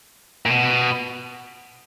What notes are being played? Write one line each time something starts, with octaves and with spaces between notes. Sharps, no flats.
A#2
B2